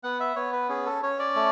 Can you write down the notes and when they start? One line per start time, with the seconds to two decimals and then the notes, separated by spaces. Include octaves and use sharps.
0.03 B3 F#5
0.20 E5
0.36 B3 C#5
0.53 B4
0.69 C#4 G#4
0.86 A4
1.03 C#4 C#5
1.19 D5
1.36 A3